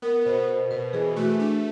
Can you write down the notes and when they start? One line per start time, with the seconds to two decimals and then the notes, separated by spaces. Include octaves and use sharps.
0.02 B3 A#4
0.25 B2 C5
0.48 B2 C5
0.71 B2 B4
0.93 E3 G#4
1.16 A3 F#4
1.39 A3 D4